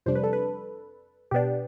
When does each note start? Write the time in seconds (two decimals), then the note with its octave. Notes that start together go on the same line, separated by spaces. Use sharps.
0.06 F2 C3 G3 D4 C5
0.15 B4
0.24 A4
0.33 B4
1.31 B2 B3 D4 G4